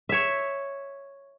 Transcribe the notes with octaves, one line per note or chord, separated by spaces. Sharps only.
C#5 E5